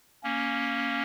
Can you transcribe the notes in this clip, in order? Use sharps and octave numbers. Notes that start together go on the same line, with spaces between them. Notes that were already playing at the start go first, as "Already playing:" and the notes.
A#3 C#4